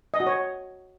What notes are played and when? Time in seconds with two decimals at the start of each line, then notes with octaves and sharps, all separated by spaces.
0.14 D#5
0.20 F#4
0.27 C#5